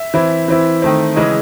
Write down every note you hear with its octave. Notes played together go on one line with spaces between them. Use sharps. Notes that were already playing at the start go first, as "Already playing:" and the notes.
Already playing: E5
E3 C4 E4
E3 C4 E4
D#3 A3 C4
C#3 E3 G#3 D#5